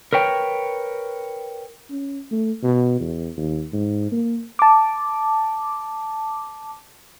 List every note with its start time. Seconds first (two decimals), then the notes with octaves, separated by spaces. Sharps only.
0.13 A#4 B4 C#5 G5
1.91 C#4
2.31 A3
2.63 B2
3.00 E2
3.37 D#2
3.73 G#2
4.12 A#3
4.59 A5 D6